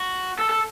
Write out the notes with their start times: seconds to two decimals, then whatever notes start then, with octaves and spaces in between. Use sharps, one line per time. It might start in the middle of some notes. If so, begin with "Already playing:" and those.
Already playing: F#4
0.39 A4
0.49 A4